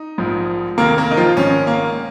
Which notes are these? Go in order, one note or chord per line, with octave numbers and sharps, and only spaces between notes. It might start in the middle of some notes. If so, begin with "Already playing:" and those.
Already playing: D#4
A#1 G#2 F3
F1 D#2 D#3 A#3 A#4
A#3 A#4
D#4
F3 F4
A#1 G#2 D#3 C#4
A#3